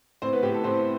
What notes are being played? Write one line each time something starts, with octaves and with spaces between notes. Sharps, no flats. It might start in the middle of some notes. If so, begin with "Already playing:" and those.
A2 C4 C5
B3 B4
A2 G4
A4
A2 C4 C5